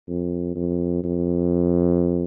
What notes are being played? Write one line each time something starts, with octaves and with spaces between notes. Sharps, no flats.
F2
F2
F2